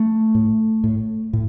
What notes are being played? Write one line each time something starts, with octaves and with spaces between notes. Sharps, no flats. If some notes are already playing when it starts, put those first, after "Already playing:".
Already playing: A3
A2
A2
A2